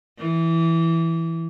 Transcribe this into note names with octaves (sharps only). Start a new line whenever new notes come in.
E3